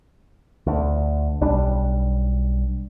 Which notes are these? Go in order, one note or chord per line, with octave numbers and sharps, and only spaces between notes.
D2
B1 G3 D4